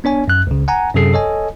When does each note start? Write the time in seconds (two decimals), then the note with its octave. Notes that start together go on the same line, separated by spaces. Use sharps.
0.04 B3 D4 C#5 G#5
0.28 F#2 F#6
0.47 C#2 C#3
0.68 F#5 G#5 A#5
0.95 F#2 C3 F#3 G#4 A4 C7
1.13 A4 C#5 D#5 G#5